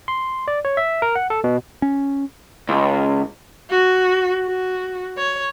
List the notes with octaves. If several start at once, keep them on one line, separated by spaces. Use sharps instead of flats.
C6
D5
C#5
E5
A#4
F#5
A4
B2
C#4
C#2
F#4
F#4
C#5